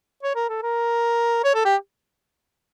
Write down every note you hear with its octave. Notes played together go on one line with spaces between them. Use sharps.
C#5
A#4
A4
A#4
C#5
A4
G4